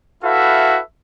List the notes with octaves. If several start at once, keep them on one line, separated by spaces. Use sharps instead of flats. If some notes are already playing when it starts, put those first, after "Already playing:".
E4 F#4 A4 B4 E5 F5